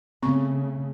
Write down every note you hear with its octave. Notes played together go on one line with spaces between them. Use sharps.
C#3 A3 B3 C4 C#6